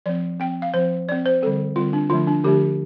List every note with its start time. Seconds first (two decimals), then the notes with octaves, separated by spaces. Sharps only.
0.06 F3 C4 D5
0.40 F3 C4 G5
0.62 F5
0.74 F3 C4 C5
1.08 F3 C4 D5
1.26 C5
1.42 D3 G3 C4 A4
1.76 D3 G3 C4 F4
1.93 D4
2.10 D3 F3 A3 D4 F4
2.27 D4
2.44 D3 F3 A3 D4 G4